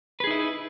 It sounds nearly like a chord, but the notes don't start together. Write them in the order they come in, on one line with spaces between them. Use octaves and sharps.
B4 G#4 D#4 E4